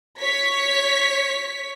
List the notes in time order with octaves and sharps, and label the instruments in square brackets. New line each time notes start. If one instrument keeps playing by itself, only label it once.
[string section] C#5 B6